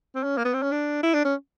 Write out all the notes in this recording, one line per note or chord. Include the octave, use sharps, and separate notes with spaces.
C4
C#4
A#3
B3
C4
C#4
D4
E4
D4
C#4